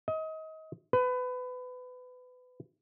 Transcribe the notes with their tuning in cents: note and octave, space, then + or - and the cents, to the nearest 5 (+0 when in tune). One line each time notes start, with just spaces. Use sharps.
D#5 +30
B4 +25